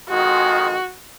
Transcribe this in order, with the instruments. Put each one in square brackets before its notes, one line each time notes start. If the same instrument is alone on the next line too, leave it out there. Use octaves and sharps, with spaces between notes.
[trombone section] F2 D#3 G#3 [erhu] F#4